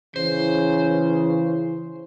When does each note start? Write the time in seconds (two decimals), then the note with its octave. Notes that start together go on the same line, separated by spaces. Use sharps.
0.16 C#3 E3 C5